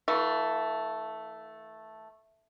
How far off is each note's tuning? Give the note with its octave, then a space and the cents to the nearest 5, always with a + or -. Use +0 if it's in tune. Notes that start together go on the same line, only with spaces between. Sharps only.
E3 -45 A3 +0 F4 +20